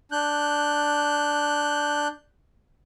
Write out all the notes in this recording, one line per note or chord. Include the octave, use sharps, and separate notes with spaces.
D4 F#6 G6